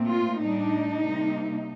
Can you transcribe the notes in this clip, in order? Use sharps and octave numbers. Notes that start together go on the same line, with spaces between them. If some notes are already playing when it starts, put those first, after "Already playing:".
Already playing: A#2 A3 C4
F4
A2 G3 D4 D#4
C3 G3 A#3